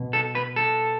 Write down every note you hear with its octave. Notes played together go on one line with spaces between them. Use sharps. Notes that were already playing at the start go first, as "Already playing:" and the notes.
Already playing: B2
A4
B4
A4